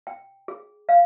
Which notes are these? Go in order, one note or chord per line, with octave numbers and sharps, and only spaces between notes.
G5
G#4
F5